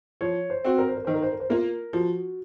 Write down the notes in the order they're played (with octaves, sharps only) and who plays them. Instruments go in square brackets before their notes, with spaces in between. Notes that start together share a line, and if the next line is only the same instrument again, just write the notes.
[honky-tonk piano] F3 [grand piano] C#5
[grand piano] C5
[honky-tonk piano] C4 F#4
[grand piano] A#4
C5
A#4
[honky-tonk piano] D#3 [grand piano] C5
[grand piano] A#4
C5
A#4
C5
[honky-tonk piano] A#3 F4 [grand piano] A#4
[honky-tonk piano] F3 [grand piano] F#4